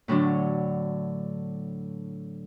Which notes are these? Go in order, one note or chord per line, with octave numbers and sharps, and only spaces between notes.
A2 D3 F#3 D4